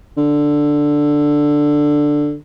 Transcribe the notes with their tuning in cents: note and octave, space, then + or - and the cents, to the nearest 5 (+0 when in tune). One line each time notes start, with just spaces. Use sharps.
D3 +5